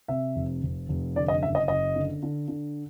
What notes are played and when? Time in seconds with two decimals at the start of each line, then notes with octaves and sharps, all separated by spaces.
0.08 C3 E5
0.35 F1
0.63 F1
0.89 F1
1.16 D3 D5
1.28 D#5
1.43 F#1 E5
1.55 D#5
1.68 F#1 D#5
1.95 D3
2.23 D3
2.48 D3